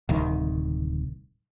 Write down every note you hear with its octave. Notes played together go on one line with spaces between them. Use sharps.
D1 C2 D#3